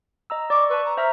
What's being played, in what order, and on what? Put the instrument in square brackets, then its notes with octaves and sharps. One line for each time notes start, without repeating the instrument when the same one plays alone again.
[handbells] D#5 A#5 E6
[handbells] D5 C#6 [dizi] D6
[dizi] B4 [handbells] A5 C#6 E6
[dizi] A#5
[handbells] C5 E5 A#5 [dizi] F6